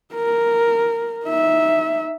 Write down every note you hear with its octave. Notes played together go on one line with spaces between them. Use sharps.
A#4
D#4 E5